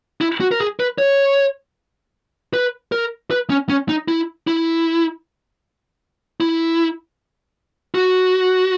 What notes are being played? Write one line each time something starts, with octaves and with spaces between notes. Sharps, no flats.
E4
F#4
A#4
G#4
B4
C#5
B4
A#4
B4
C#4
C#4
D#4
E4
E4
E4
F#4